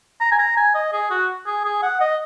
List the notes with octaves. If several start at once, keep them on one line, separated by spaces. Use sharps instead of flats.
A#5
G#5
A#5
G#5
D#5
G#4
F#4
G#4
G#4
F#5
D#5